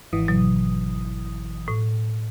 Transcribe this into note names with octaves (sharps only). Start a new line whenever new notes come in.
G#1 E3 D#6
B2 F#3
A2